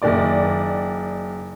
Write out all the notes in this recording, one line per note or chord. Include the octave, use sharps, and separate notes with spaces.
F#1 D#3 D5 D6